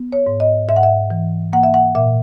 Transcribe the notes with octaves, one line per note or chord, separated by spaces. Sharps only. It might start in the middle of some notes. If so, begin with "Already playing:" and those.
Already playing: B3
C#5
G#2
D#5
G#2 E5
F#5
E5
E3
A#3 F#5
E5
F#5
A#2 E5